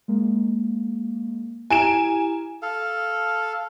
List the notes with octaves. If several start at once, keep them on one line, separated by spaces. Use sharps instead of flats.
G#3 A#3
E4 G4 G#5 A#5 D7 E7
A4 F5